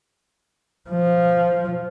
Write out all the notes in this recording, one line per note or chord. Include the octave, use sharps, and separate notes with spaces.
F3